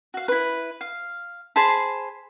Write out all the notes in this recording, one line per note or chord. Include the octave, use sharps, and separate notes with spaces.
F#4 F5
E4 B4
F5
G#4 C5 A5 B5